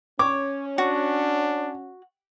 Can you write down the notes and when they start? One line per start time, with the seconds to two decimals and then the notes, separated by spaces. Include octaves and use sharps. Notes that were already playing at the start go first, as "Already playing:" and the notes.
0.19 C#4 C#5 D6
0.78 D4 F#4